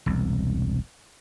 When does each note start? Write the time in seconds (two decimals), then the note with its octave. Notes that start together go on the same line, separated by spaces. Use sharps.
0.06 E1 C2